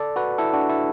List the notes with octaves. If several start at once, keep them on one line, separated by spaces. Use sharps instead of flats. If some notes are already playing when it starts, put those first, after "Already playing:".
Already playing: A4 D5
F#4 B4
E4 A4
D4 F#4
E4 A4